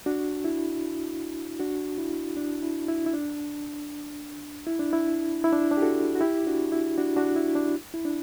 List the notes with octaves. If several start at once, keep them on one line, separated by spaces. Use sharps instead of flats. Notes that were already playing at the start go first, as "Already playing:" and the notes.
D4 F#4
E4
D4 F#4
E4
D4
E4
E4
E4
D4
E4
D4
E4
E4
D4
D4
G4
F#4 A4
F#4
E4 G4
D4 F#4
E4
D4 F#4
D4 F#4
E4
D4
E4
D4